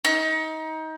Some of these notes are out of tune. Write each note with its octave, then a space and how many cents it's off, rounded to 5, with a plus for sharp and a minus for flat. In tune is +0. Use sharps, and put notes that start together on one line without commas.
D#4 +25